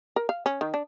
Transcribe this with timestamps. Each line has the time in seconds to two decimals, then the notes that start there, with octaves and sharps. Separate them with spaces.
0.16 A#4
0.29 F5
0.46 C#4
0.61 D#3
0.74 D4